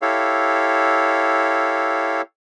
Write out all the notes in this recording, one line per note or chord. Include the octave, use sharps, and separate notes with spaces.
E4 G4 A4 C#5 F5